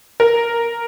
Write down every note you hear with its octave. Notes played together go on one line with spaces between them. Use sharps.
A#4